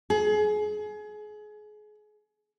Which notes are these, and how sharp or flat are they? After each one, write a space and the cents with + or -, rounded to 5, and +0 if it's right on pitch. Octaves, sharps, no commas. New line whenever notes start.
G#4 +30